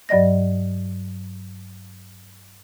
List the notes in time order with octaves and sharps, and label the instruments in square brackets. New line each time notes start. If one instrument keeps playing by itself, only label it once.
[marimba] G2 F#3 D5 D#5 A#6